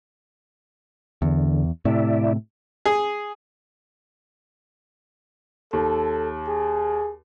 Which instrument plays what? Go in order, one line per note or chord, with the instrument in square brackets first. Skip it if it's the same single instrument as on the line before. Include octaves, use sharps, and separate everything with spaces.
[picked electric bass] E2 [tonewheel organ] D3
[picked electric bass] A2 C3 [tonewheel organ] E4 D5 E5
[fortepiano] G#4
[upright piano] D#2 [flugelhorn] A4
[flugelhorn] G#4